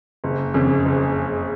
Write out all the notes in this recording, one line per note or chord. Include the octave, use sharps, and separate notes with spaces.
F#1
F2 C#3
F#1